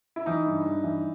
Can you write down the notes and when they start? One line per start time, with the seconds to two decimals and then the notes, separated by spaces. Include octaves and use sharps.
0.16 E4
0.26 E3 D#4
0.46 G2
0.66 G2
0.84 E3